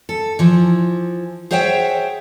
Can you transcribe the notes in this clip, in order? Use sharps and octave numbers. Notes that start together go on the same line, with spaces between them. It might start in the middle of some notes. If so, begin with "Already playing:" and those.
A4
E3 F3
G#4 C5 C#5 E5 F#5 G5